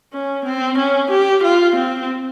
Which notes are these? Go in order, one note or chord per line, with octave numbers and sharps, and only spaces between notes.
C#4
C4
C#4
G4
F4
C4